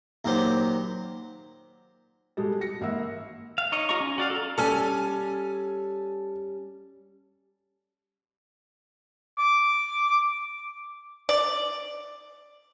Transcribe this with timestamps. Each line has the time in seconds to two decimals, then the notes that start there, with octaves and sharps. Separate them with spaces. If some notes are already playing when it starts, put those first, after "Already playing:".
0.25 D#2 A#2 F#3 G4 C5
2.37 B2 G3 G#3 G4 A4
2.61 A#6 C#7
2.81 G#1 A#3 E5 F#5 E6
3.58 F5
3.72 D#4 C#5 D#5
3.89 F4 G4 D#5 A#5 C#6
4.00 C#4
4.18 F#4 D5 F5
4.30 A4 A#5
4.58 G3 C#4 A4 G#5 F6
9.38 D6
11.29 D5